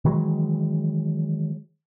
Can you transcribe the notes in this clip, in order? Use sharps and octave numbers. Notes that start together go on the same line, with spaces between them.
D#3 E3 F#3 G#3